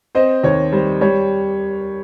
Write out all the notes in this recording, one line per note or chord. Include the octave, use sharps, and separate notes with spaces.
C4 C5 D#5
D#2 C#5
G3 C5
G3 C#5